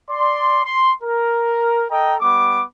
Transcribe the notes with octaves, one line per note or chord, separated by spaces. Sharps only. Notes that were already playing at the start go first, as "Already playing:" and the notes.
D5 C6
C6
A#4
A4 D#5 G5 A#5
G3 B3 D6